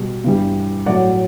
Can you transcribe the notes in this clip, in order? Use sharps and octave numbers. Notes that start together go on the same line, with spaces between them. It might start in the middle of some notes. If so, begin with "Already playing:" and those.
Already playing: B2 G3
G2 E3 G3
A2 F#3 A3 D5 F#5